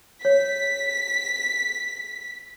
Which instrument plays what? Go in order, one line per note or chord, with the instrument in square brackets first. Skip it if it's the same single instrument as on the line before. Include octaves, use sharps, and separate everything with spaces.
[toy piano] C#5 [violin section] B6